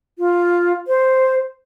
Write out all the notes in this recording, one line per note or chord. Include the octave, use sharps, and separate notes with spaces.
F4
C5